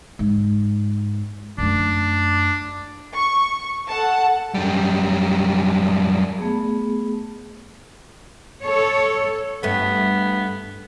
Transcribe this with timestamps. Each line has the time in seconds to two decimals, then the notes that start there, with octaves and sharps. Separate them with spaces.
0.19 G#2
1.58 F#2 A3 D4
3.13 C#6
3.88 A4 F#5 A5
4.54 F#2 G3
6.38 A3 B3 G#4
8.63 A4 C#5
9.63 G2 A3 B3